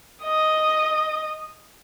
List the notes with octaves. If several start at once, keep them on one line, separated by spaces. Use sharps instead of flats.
D#5 D#6